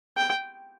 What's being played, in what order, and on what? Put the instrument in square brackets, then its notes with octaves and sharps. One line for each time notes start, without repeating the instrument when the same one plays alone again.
[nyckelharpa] G5